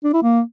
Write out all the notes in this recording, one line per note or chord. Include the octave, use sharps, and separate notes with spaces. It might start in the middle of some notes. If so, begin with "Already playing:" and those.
D4
E4
A#3